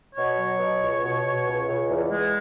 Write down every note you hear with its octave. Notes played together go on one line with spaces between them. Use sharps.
B2 C#5
F#3
B2
C#2
B2
B2
C#2
C#2
E2
G#3